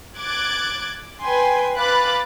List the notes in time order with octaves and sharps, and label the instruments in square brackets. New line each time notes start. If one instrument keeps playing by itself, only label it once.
[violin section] D6 F#6 G#6 A6 D7
B4 G5 G#5 C6
B4 F5 B5 D6 F#6 A6